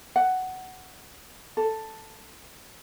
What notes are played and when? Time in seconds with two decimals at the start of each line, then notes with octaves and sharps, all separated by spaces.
0.16 F#5
1.57 A4